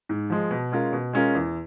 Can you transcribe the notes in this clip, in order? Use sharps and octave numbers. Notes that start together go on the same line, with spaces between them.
G#2
F3 G#3
B2
G#3 C#4 F4 A#4
B2
G#3 C#4 F4 A#4
E2